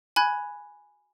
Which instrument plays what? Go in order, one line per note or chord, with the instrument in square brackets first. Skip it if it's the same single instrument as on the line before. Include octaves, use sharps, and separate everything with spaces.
[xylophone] G#5 B5 F#6 G#6